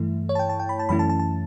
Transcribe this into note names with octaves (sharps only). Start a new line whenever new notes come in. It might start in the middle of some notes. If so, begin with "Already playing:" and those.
Already playing: G2 E3 A3 E4
C#5
A5
G5
A5
G5
B5
A5
F#2 E3 A3 C#4 E4 B5
A5
A5
A5